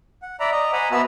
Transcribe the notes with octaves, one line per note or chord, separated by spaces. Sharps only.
F#5
D5 E5 A#5 B5
D#5 A#5
C5 F#5 G#5 A#5 B5
B3 F#4 E5 A5 B5 E6